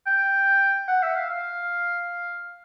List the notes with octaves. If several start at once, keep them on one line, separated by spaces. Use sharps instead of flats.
G5
F#5
E5
F5
F5